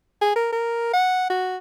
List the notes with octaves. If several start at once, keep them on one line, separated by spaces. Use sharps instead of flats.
G#4
A#4
A#4
F#5
F#4